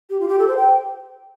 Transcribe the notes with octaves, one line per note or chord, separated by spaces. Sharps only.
G4
F4
G4
A4
C5
G5